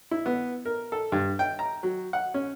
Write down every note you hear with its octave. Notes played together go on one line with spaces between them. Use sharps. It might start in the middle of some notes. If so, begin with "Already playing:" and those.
E4
B3
A#4
A4
G2
G5
A#5
F#3
F#5
C#4